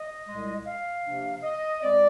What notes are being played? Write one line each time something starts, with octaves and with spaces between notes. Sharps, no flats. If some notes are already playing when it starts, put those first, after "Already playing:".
Already playing: D#5
C2 A#2 G#3
F5
C3 F3 A#3 D4
D#5
A#2 G#3 C4 D5